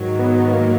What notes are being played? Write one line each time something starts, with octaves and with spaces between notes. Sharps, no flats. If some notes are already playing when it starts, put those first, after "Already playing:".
Already playing: G#2 D#3 F#3
B3
A#3